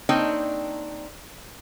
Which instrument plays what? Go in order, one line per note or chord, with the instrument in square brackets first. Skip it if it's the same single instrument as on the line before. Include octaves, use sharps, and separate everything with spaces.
[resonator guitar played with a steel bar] A#3 C4 D4 D#4 C#5 G5